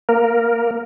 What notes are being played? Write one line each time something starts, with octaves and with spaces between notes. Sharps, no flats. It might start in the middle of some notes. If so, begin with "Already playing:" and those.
A#3 A#4